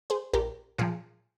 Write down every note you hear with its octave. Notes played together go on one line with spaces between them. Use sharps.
G#4 C5
A#1 G4 A#4
A#2 F3 F4 G#4